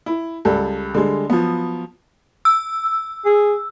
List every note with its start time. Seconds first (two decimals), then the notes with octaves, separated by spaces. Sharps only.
0.06 E4
0.45 C#2 G3 A4
0.95 D3 G3 G#3
1.30 F3 F#3 B3
2.45 E6
3.25 G#4